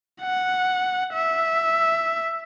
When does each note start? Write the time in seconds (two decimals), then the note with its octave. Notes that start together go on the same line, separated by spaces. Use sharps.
0.22 F#5
1.13 E5